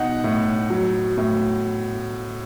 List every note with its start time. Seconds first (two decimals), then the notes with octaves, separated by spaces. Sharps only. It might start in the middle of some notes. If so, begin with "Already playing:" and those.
Already playing: B2 D#4 F#5
0.24 A2
0.70 F#3
1.18 A2